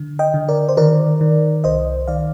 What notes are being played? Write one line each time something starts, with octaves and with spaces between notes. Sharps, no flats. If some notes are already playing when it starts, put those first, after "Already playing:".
Already playing: D3
D#5 G5
D3
A#4 D5
C5
D#3 A#4 D5
D#3
C2 C5 D#5
D#3 D5 F5